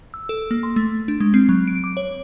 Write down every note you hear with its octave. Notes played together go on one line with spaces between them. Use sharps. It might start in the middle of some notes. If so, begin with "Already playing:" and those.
E6
A4
A#3
C6
A3
D4
G#3
C4
F#3
D7
D6
C#5